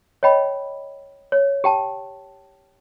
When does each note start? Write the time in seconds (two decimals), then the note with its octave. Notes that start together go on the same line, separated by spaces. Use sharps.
0.23 C#5 D#5 G5 B5
1.32 C#5
1.64 G4 G5 A5